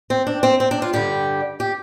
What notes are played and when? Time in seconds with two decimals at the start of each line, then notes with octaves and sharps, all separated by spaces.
0.10 C4
0.27 D4
0.43 C4
0.60 C4
0.71 D4
0.82 F4
0.93 G2 D3 G3 G4
1.60 G4